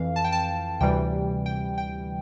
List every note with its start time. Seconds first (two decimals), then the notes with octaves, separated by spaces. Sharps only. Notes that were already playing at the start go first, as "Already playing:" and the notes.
Already playing: F2 E3 F5
0.16 A5
0.24 G5
0.32 A5
0.80 D2 C3 E3 G3 G5
1.46 G5
1.78 G5